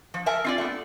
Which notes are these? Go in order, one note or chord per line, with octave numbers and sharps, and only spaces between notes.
F3
A#4 E5 G#5 A5
C4 F4 D5
A3 B3